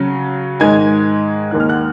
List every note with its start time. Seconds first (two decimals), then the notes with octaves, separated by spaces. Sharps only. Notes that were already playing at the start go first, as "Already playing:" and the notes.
Already playing: C#3 F#3 C#4
0.60 G#2 D#3 G#3 G#5 G#6
1.51 D#2 D#3 G#3 D#4 F#6
1.60 F6
1.69 F#5 F#6